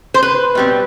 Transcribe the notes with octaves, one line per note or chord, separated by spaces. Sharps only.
C5
B4
B2 G3 C4